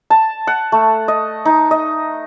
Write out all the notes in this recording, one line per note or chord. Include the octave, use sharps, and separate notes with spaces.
A5
F#5
A3
D#5
D#4
D#5